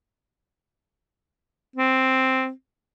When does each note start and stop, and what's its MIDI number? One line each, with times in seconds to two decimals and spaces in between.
1.76 2.51 60